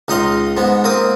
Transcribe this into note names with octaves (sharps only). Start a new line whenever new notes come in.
C#2 D#4 D#5 F5 C6
G#2 G#3 B3
A#3 C4 D#6